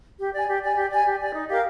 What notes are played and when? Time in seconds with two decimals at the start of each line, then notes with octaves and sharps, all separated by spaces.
0.19 G4
0.33 D5 G#5
0.48 G4
0.63 D5 G#5
0.76 G4
0.91 D5 G#5
1.05 G4
1.20 D5 G#5
1.34 D#4
1.48 G4 A#4 F5